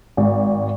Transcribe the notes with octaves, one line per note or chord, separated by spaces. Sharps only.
G#1